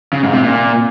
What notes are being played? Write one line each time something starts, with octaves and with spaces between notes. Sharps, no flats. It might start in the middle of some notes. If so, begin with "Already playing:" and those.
C#3
G#2
C3
A#2